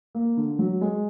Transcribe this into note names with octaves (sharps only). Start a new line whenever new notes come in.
A#3
D3
F#3
G#3